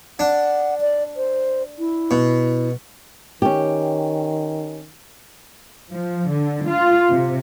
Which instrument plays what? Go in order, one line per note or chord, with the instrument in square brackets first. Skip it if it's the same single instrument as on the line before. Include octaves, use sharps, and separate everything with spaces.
[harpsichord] D4 [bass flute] F#5
[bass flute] D5
C5
E4
[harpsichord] B2
[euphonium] D#3 [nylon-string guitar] C#4 G4
[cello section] F3
D3
F4
C3